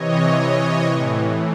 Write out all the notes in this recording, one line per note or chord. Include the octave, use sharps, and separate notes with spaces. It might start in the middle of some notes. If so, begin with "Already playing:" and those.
Already playing: C3 E3 C#5 D#5
A2 E3